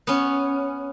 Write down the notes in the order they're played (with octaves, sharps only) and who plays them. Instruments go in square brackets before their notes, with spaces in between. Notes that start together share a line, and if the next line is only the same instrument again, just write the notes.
[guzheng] B3 C#4